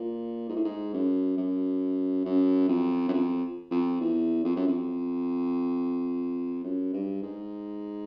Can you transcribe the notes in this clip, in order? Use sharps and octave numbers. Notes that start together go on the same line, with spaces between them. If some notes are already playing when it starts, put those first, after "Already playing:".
Already playing: A#2
G#2
A2
G#2
F#2
F#2
F#2
F2
F#2
F2
F2
E2
F2
F#2
F2
F#2
G2
G#2